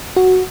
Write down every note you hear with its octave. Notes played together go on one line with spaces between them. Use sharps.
F#4